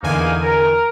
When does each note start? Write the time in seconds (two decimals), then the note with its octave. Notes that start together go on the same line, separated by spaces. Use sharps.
0.03 E2 D3 A#3 D#4 G#5
0.41 A#4